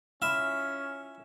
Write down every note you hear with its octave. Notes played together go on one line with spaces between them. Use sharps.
C#4 E4 F4 E5 F6